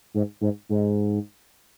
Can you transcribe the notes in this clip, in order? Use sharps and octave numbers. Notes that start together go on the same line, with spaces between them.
G#2
G#2
G#2